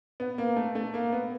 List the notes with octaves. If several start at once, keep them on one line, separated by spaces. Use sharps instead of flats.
B3
A#3
A3
A3
A#3
B3